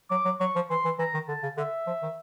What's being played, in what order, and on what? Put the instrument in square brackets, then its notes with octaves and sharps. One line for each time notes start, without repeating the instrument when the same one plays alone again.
[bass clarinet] F#3 [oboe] D6
[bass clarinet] F#3
[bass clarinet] F#3 [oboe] C#6
[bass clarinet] F3
[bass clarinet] E3 [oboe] C6
[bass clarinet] E3
[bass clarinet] E3 [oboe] A#5
[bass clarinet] D#3
[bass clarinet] D3 [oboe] A5
[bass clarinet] C#3
[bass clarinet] D3 [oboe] E5
[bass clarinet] F3
D#3